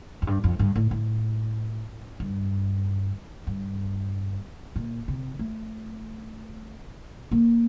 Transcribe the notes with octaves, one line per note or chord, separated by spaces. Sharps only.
F2
G2
F2
G2
A2
A2
G2
G2
A#2
C3
A3
A#3